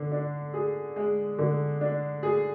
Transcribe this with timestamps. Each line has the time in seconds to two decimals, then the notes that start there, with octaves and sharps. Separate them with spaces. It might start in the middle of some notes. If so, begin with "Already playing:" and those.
Already playing: D3
0.12 D4
0.54 G#4
0.96 G#3
1.39 D3
1.81 D4
2.23 G#4